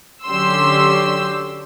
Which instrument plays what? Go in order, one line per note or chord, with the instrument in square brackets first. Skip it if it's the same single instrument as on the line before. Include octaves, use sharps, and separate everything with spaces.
[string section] D3 F#3 C#4 G4 C6 E6